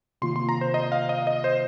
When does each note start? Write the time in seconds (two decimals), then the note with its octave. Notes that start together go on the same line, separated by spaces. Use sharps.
0.22 C3 D#3 A#3 F4 C6
0.36 C6
0.49 A#5
0.61 C5
0.74 D#5
0.92 F5
1.09 D#5
1.27 D#5
1.44 C5